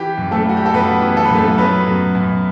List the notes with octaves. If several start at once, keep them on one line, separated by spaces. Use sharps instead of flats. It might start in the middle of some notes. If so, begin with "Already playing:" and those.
Already playing: E3 G4
F#2
A3 A4
G3 F#4
G4
A4
F#2 B3 B4
E3
A4
F#2 B4
A3 A4
F#3 B3 B4
F#2
F#2